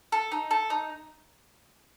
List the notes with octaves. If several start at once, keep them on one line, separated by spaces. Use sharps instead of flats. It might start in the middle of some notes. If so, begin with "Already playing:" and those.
A4
D#4
A4
D#4